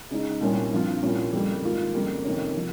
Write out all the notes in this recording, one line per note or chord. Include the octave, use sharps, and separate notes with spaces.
C#3 G#3 D#4
C2 A#2 G3 C#4
G2 F3 C4 F4
C2 A#2 G3 C#4 F4
F2 C#3 G3 A#3
G#2 D#3 A#3 F4
F2 C#3 G3 A#3
F2 C3 D#3 A#3 C#4
C3 F3